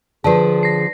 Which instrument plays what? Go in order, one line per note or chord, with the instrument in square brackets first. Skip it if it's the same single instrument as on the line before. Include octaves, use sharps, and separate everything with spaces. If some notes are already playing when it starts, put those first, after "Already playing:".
[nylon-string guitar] D3 F3 [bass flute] G#4 [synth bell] B4 D5 A5
[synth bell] A#6 C7